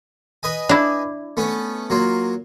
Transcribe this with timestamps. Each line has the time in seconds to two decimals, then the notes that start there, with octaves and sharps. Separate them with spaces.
0.43 B4 D#5 G#5
0.69 D4 E4
1.37 A3 B3 C#4
1.90 F#3 A#3 F4